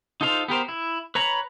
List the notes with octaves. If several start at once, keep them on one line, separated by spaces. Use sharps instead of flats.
D#4 F4 A4 C5 F5
B3 G4 A#4 C5
E4
B4 C#5 A#5 B5